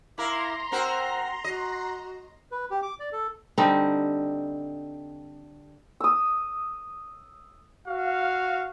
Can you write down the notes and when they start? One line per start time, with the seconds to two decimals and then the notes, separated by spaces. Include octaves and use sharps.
0.18 E4 A#4 E5 F5 A#5 C6 D6
0.72 C4 F#4 A#4 C5
1.44 F#4 D#5
2.51 B4
2.71 G4
2.82 D6
3.00 D5
3.12 A4
3.58 D3 G3 C4 D#4
6.00 D#6 E6
7.88 F#4 F5